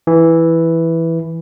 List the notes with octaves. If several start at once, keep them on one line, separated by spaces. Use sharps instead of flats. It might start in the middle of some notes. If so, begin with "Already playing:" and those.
E3